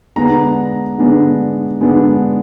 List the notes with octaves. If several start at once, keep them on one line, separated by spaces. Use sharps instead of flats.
D3 G#3 B3 D4 A#5
D3 G#3 B3 D4
D3 G#3 B3 D4